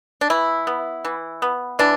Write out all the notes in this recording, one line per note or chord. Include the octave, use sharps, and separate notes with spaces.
D4
E3 E4
B3
E3
B3
E3 D4